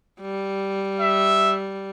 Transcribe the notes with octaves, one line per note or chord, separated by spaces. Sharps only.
G3
E5